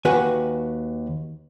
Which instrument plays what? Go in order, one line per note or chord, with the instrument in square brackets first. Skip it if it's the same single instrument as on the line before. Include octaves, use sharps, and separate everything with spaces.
[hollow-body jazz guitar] D#2 F#4 B4 G#5